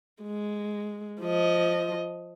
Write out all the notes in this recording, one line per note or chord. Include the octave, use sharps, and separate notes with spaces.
G#3
F3 D#5